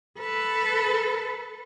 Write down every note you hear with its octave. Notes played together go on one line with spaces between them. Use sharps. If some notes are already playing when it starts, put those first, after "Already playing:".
A4 B4